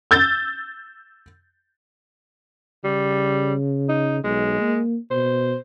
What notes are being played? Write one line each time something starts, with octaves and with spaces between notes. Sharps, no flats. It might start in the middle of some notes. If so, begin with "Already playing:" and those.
E6 G6 A6
C#3 G3
D#4
B1 G#3
A#3
B2 C5